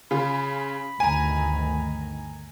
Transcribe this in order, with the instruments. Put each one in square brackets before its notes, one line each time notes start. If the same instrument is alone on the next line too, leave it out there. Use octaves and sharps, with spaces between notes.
[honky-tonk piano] C#3 F4 [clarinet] B5
[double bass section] G1 D2 D#3 [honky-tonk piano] G#5 A#5